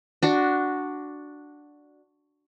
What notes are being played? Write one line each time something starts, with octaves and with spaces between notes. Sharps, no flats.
D4 F#4